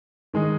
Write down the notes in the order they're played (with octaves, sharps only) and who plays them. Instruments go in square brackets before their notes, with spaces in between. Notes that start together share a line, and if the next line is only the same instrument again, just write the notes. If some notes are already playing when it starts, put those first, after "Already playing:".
[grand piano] D#3 G#3 D#4